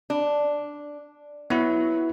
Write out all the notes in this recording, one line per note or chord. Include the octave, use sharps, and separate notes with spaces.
D4
F#3 B3 E4